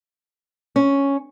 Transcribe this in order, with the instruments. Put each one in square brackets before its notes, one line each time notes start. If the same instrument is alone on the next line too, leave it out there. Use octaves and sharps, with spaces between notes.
[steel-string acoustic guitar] C#4